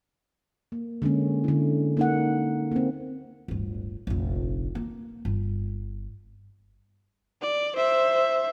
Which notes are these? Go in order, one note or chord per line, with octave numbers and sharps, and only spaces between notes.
A#3
D3 G#3 A#3 C#4
D3 E4
A#3 D#4 F#5
A#3 C4
D1 G1
F1 A#1
A#3
G1
D5
C5 E5